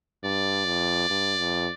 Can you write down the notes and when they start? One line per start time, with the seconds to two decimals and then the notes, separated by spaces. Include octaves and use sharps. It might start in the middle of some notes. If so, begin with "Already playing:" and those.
0.23 G2 D5
0.66 F2
1.10 G2
1.38 F2